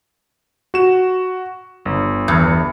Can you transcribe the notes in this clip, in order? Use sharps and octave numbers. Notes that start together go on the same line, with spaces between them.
F#4 E7
G1
E2